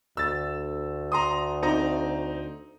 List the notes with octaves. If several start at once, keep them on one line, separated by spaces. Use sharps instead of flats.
D2 E6 A6
A#5 C6 D#6
C4 D#4 A#5